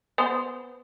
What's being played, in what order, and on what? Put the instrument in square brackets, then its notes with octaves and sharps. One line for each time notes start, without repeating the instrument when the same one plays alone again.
[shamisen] B3 C5